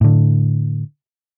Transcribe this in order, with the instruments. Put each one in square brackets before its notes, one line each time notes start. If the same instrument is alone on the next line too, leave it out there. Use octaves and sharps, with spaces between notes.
[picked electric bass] A2 D3